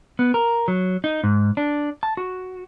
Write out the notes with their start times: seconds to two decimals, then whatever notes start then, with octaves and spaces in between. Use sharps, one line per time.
0.19 B3
0.34 A#4
0.68 F#3
1.04 D#4
1.24 G#2
1.57 D4
2.03 A5
2.17 F#4